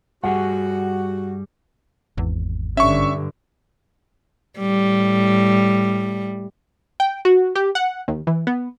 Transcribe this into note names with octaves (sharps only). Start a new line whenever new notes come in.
G2 G3 F#4 G#4 F#5
G#1 E2
G2 D3 C#4 E5 C#6
A2 G3
G5
F#4
G4
F#5
D#2
E3
B3